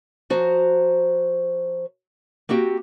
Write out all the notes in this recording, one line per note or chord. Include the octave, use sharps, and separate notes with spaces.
F3 F#4 C5 A#5
A#3 C4 F#4 G4